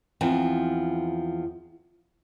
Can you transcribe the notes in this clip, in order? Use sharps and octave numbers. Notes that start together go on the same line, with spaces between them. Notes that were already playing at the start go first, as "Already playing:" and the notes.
E2 F3 C4